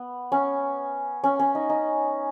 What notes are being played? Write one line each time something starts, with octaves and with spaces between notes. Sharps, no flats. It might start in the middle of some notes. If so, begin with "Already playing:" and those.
Already playing: B3
C#4
C#4
C#4
D#4
D#4